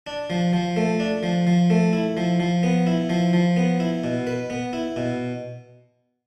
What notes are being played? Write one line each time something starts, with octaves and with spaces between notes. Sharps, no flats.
D4
F3
F3
A3
D4
F3
F3
A3
E4
F3
F3
B3
E4
F3
F3
B3
E4
B2
B4
B3
E4
B2